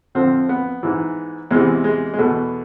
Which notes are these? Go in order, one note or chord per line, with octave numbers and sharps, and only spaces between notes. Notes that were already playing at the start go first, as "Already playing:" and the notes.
F2 D3 F3 C4
B3
G#2 E3
E2 C3 E3 G#3
G#3
G#3
E2 B2 A3